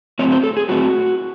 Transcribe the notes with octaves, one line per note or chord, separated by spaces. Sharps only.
A2 F#3 C4 C#5
C5
A4
G#4
A2 F#3 C4 F#4